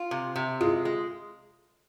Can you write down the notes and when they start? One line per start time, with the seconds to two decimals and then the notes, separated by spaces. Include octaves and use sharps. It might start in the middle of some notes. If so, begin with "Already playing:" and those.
Already playing: F4
0.11 C3
0.36 C3
0.60 G#3 F4 G#4
0.85 G#3